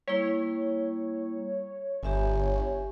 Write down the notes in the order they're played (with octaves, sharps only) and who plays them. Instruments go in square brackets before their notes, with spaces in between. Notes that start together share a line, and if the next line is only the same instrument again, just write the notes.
[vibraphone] G3 A#3 E4 [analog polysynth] C#5
[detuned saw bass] G1 [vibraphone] G4 E5 G#5